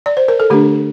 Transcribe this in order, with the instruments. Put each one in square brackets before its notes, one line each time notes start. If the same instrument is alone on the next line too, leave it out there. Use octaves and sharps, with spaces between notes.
[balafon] D5
C5
A#4
A4
D3 A3 D4 G4